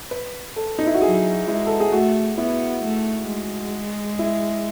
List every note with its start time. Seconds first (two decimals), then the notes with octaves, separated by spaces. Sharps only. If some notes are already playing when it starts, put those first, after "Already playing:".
0.11 B4
0.56 A4
0.79 D#4
0.87 E4
0.94 F#4
1.02 F#3 G#4
1.48 G#3 E4
1.67 A4
1.80 G#4
1.92 A3 F#4
2.38 B3 E4
2.84 A3
3.29 G#3
4.19 E4